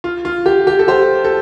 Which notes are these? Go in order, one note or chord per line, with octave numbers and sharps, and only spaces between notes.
F4
F4
G4
G4
A4
G4 C5
A4